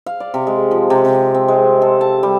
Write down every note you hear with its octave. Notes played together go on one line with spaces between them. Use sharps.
F5
D5
C3
G#3
F3
C3
C3
C4
G#3
A4
A5
G3